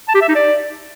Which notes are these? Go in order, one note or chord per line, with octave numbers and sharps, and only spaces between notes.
A5
G4
E5
D#4
D5